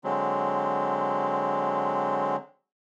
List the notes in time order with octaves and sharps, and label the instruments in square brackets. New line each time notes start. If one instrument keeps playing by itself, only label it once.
[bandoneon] D3 F#3 G#3 C4